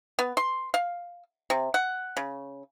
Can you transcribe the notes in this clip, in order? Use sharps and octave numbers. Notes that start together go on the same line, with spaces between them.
B3
C6
F5
C3
F#5
C#3